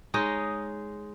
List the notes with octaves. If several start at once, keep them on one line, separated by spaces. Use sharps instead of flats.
G#3 D#4 C#5 D#5